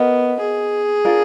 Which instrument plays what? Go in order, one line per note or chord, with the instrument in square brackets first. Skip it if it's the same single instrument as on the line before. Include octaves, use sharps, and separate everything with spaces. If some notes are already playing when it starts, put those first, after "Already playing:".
Already playing: [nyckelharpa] B3 [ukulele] F#4 A#4 D#5
[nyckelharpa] G#4
[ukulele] D4 F4 A#4 F5